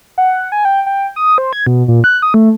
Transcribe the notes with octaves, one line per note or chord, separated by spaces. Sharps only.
F#5
G#5
G5
G5
D#6
C5
G#6
B2
A#2
F#6
D#6
A3